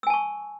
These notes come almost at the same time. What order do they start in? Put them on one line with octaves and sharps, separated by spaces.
E6 G#5 A5 C#6